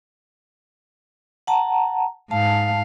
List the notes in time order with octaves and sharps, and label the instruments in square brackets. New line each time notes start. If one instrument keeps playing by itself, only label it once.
[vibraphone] F#5 A5 A#5
[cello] G#2 F5 [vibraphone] A5